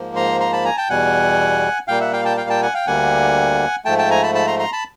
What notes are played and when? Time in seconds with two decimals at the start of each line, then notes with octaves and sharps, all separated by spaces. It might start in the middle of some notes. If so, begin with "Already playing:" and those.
Already playing: G#2 F3 A#3
0.16 A#5 C6
0.40 A#5 C6
0.53 A5 B5
0.65 G#5 A#5
0.77 G5 A5
0.89 E2 B2 G3 F#5 G#5
1.88 A#2 G3 A#3 F5 G5
2.00 E5 F#5
2.13 F5 G5
2.25 G5 A5
2.37 F5 G5
2.49 G5 A5
2.62 F#5 G#5
2.74 F5 G5
2.87 D2 D3 G3 A#3 F#5 G#5
3.85 G#2 F3 A3 G5 A5
3.98 G5 A5
4.11 G#5 A#5
4.23 A5 B5
4.35 A5 B5
4.47 A#5 C6
4.59 A#5 C6
4.73 A5 B5